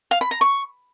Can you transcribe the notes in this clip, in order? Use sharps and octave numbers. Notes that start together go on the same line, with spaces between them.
F5
B5
A#5
C#6